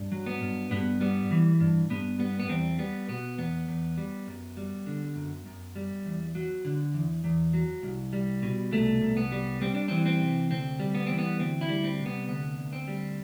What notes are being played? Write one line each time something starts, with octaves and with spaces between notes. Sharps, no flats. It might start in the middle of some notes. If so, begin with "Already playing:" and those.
Already playing: G2
F#3
B3
G2
G2 B3
G3 B3
E3
G2
G2 B3
G3 B3
B3
E2 C4
G3 B3
B2 B3
E2 B3
E2
G3
F#2
G3
D3
F#2
F#2
G3
E2
F#3
D3
E2
E2
F#3
C2
G3
B2
C2 A3
C2
B3
G3
G3 C4
D4
E3 C4
C4
C3
D2 C4
G3
B3
E3 C4
B3
D2 C4
E4
G3
C4
C3
B3
D2 B3
D2
C4
G3